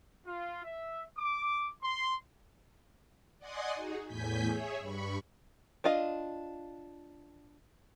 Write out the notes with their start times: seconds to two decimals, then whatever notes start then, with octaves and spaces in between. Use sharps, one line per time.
0.26 F4
0.64 E5
1.18 D6
1.82 C6
3.39 D5 D#5 F#5 G#5 C6 D#6
3.75 D#4 F#4 G#4
4.06 E2 A2 G#5 G6 B6
4.47 G#4 C#5 E5
4.79 G2 B5 C#6
5.84 D4 F4 D#5 F5